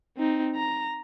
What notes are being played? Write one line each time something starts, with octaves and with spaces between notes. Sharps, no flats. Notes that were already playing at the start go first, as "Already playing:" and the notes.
C4 D#4
A#5